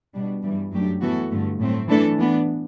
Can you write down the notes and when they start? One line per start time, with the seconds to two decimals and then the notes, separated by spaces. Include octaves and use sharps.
0.14 B2 G3 D4
0.43 G2 E3 G3
0.72 F#2 F#3 A3 D4 G4
1.01 A2 E3 B3 F#4 A4
1.30 G2 D3 A3
1.60 A2 F#3 A3 C4
1.89 E3 A3 D4 A4
2.17 E3 B3 D4